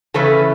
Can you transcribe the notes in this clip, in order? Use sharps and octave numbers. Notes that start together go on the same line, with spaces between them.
C#3 E3 A3 C#4 E4 A4 B4